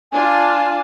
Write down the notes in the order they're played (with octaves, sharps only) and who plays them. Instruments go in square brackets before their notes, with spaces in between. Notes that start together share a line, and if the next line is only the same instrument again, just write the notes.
[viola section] D4 F4 A5 [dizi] G#5